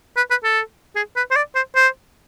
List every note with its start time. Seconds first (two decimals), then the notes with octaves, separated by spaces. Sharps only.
0.17 B4
0.30 B4
0.44 A4
0.96 G#4
1.16 B4
1.31 C5
1.36 D5
1.55 C5
1.75 C5